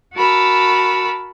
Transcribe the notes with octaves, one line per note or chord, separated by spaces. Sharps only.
F#4 A#4 A5 B5 E6